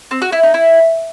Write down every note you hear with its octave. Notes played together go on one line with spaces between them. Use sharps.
C4
F#4
E4
D#4
E4